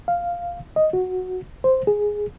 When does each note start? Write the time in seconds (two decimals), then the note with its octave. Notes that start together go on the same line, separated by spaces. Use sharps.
0.08 F5
0.76 D#5
0.93 F#4
1.64 C5
1.87 G#4